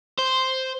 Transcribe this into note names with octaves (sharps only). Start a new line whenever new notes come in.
C5